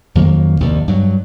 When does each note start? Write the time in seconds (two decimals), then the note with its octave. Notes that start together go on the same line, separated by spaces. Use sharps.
0.15 F2 D#3 F#3 A#3
0.60 A#1 D#2 C3
0.88 G2 F#3